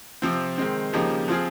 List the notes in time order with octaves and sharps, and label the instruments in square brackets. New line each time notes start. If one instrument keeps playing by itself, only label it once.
[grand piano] C3 F3 C4
D#3 G#3 C4
C#3 F3 A#3 D#4 G4
F3 C4 F4 G#4